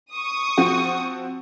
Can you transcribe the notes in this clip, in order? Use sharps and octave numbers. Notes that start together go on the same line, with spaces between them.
C#6 D#6
F3 C4 F#4